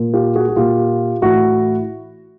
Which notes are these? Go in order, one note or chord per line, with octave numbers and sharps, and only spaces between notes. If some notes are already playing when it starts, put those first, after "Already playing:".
Already playing: A#2
F4 G4
F#4 G#4
F#4
A#2 F4 G4
A2 E3 E4 F#4